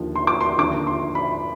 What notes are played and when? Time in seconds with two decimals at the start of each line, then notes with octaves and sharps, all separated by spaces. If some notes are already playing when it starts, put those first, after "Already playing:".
Already playing: D#2 D3 F3
0.15 C6
0.27 D6
0.41 C6
0.58 D#2 D3 F3 D6
0.87 C6
1.15 B5